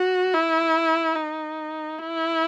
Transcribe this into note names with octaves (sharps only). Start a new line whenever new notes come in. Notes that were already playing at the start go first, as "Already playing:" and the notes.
Already playing: F#4
E4
D#4
E4